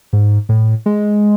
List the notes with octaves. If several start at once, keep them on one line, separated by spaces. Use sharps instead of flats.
G#2
A2
G#3